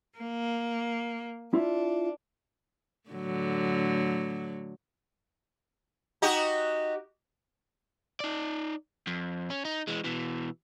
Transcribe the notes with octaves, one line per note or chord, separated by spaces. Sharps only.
A#3
D4 E4 F4 E5
A2 D3 F#3
D#4 F#4 G4
D#4 D5
F2
C#4
D#4
E3 G#3
B2 E3